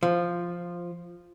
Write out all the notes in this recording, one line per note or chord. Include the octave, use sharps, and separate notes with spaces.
F3